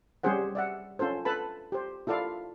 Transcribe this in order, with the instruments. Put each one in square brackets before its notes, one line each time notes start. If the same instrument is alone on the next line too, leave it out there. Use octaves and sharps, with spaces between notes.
[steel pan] G3 C#4 G4 G#4 C5 F#5
D5 E5 F#5
C#4 F4 A4 C5
A4 B4 A5 B5
G4 C5
E4 F4 A4 D5 F5